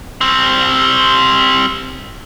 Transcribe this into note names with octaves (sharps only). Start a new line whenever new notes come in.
G3 C4